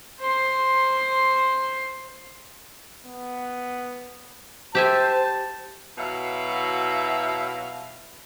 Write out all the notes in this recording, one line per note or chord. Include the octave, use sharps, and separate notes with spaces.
C5 C6
B3
G4 C5 E5 G#5 A5
B2 F#3 E4 F5